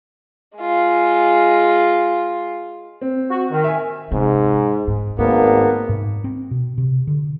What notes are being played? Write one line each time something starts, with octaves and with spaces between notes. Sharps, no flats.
G#3 F4
C4
F#4
D#3
E5 G#5
G#2 C3
G#2
G#1 G#2 A#3 B3
G#2
C4
B2
C3
D3